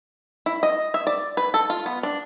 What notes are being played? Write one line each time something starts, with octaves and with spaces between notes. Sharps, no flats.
E4
D#5
E5
D5
B4
A4
F4
B3
D4